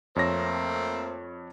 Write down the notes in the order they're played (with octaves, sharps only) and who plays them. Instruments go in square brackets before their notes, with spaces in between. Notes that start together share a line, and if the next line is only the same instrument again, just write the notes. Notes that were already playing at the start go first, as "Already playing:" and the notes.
[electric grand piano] F2 C#5 A#6 [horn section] A3 A#3 C4